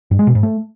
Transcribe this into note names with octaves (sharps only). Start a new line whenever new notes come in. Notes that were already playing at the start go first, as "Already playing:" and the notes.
G2
G#3
B2
G#2
A3